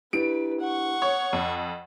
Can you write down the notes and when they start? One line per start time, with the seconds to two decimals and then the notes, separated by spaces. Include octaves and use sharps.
0.13 D4 E4 G4 B4 D7
0.61 F#5 C#6
1.02 C#5 D#6
1.33 F2